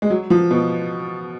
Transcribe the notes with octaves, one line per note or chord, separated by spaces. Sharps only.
G#3
F#3
F3
B2